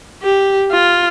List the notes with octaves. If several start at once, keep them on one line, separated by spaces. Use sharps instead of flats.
G4
F4